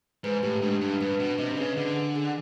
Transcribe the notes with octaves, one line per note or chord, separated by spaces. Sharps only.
G#2 B4
A2 G4
G#2 D4
G2 D4
G2 B4
B2 D4
C3 D#5
C3
C#3 B4
D3 G#4
G#4
G#4